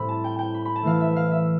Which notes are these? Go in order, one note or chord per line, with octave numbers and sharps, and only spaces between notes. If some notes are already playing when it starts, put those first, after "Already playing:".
Already playing: A2 G3 C4 E4 B5
A5
G5
G5
B5
B5
A5
E3 A3 E4 F5
E5
F5
E5